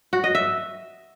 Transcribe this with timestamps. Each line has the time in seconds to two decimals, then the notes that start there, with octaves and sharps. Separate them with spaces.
0.13 F#4
0.24 D#5
0.35 E5